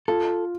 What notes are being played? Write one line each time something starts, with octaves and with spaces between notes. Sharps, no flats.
F4 A4